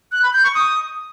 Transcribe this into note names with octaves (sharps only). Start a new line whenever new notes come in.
F#6
B5
G6
C#6
D#6